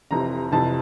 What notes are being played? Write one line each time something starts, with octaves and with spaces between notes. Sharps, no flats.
F1 F2 C3 E3 A#5
F1 F2 C3 E3 A5